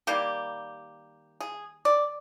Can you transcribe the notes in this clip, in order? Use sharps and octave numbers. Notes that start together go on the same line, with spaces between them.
D#3 G3 A#3 G4
G#4
D5